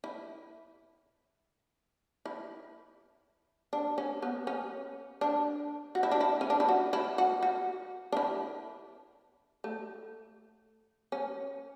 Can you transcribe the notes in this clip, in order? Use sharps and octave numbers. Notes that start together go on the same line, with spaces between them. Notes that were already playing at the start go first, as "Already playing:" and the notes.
E4
E4
D4
C#4
B3
C#4
D4
F#4
E4
D4
E4
C#4
D4
E4
F#4
E4
F#4
F#4
D4
E4
A3
C#4